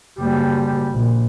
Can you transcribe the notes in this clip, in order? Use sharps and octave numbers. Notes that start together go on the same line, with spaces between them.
F#1 G3
A#1